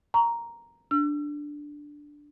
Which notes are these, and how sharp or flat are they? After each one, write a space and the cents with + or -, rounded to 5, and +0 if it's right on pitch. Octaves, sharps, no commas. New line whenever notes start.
A#5 +0 C#6 +30
D4 +0 E6 +40